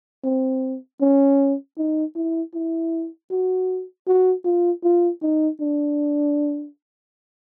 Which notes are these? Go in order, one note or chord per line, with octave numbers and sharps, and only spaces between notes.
C4
C#4
D#4
E4
E4
F#4
F#4
F4
F4
D#4
D4